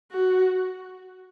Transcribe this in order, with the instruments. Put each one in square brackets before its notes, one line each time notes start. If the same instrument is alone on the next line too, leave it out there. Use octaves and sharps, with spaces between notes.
[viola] F#4